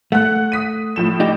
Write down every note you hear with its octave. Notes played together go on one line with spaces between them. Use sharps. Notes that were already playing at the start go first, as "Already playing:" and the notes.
A3 F#5 F#6
D#6 B6 D#7
A2 F3 E7
D#4 G4